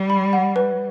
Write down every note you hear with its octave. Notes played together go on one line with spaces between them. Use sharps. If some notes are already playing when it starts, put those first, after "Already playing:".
Already playing: G3
B5
F#5
B4